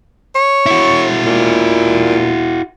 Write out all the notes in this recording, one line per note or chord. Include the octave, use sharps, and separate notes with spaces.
C#5
E4 F#4
A#2